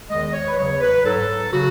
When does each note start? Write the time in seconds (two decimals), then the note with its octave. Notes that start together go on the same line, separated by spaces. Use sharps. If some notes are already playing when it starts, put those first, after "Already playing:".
0.09 E2 D#3 G#3 D#5
0.33 C#5
0.48 B4
0.57 E2 C#3 F#3 C#5
0.80 B4
1.04 G#2 F#3 A4
1.52 C#3 F#3 F#4